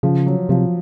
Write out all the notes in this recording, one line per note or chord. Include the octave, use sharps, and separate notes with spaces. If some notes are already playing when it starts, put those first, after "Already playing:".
C#3 F3
F#3
C3 F3